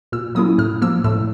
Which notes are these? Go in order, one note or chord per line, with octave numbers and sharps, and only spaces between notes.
A#2 E6
F#3 A#3 C#4 E4 D#6
A2 F6
F3 A#3 E6
A2 E6